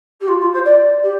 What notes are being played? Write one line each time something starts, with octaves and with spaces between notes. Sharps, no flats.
G4
F4
F4
C5
D5
G4